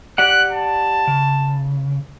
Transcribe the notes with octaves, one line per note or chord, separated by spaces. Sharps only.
G4 D5 F#5 F#6
A5
C#3